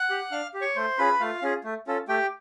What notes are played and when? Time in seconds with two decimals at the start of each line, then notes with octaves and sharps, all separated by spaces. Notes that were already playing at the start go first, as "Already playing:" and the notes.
Already playing: F#5 F#6
0.10 G4
0.31 D4 F5 F6
0.54 G4
0.61 C#5 C#6
0.76 A3 C5 C6
0.98 C#4 F4 G#4 B4 B5
1.20 A3 F4 F5
1.42 C#4 F4 G#4
1.64 A3
1.87 C#4 F4 A4
2.08 A3 G4 G5